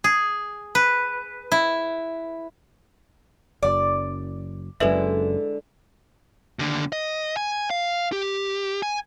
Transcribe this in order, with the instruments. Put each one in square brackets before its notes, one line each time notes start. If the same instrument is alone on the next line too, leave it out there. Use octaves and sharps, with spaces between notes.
[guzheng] G#4
B4
E4
[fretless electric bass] F#1 F#2 [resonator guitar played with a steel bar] D5
[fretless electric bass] F#1 F#2 [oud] D3 G#3 [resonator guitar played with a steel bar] E4 [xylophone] A4 B4 E5
[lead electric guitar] D#2 D3
D#5
G#5
F5
G4
G#5